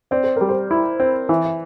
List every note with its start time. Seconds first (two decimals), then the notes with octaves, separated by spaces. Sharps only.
0.11 C4 D5
0.24 C5
0.36 G3 A#4
0.49 C5
0.71 E4
1.00 C4
1.29 E3 E5
1.45 E5